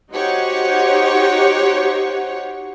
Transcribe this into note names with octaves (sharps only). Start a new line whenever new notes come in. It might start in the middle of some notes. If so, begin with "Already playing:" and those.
D#4 F#4 G4 C5 C#5 F#5